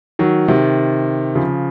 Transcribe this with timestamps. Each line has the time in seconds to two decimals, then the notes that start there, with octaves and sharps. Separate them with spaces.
0.19 D#3 F#3
0.48 C3 D#3
1.35 C#3 F3